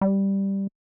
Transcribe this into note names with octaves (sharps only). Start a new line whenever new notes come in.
G3